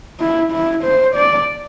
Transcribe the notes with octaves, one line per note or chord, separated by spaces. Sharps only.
E4
E4
C5
D5